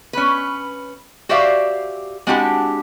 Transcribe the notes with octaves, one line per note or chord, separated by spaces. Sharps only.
C#4 B4
F#4 G4 C5 D5 E5 F5
G#3 C4 D4 E4 F#4 G4